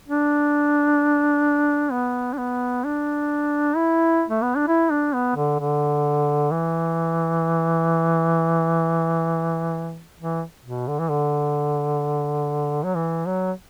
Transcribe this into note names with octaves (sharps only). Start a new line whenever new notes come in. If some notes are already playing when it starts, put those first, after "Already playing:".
D4
B3
D4
B3
D4
E4
A3
B3
D4
E4
D4
B3
D3
D3
E3
E3
B2
D3
E3
D3
F#3
E3
F#3